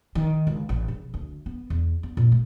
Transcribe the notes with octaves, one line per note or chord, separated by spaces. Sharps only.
D#3
C#2
A1
C#3
D2
B3
E2
B3
A#2
A3